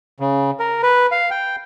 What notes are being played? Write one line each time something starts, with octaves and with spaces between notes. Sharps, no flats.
C#3
A#4
B4
F5
G5